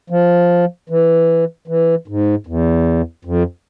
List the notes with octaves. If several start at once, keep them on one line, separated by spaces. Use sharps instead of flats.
F3
E3
E3
G#2
E2
F2